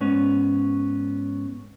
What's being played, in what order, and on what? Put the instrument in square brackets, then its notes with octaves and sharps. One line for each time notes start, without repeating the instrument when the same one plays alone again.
[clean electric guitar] G#2 B3 C#4